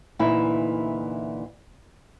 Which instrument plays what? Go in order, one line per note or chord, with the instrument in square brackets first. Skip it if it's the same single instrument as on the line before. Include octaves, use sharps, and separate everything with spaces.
[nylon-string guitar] D2 A#2 E3 D#4 E4 E5